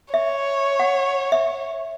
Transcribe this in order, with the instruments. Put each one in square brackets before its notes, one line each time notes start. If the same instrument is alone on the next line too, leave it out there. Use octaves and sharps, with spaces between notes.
[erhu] C#5 [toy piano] E5
[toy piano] F#5
E5